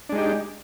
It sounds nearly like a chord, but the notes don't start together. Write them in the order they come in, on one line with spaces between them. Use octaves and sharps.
D4 G#3 D#4 G4